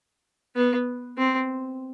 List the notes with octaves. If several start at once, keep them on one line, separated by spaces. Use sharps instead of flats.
B3
C4